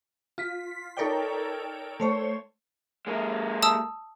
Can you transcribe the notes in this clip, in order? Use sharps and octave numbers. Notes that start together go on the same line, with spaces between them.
F4 B6
D#4 A4 A#4 C#5 D5 G5
A3 C5 C#5
G#3 A#3
A5 D#6 E6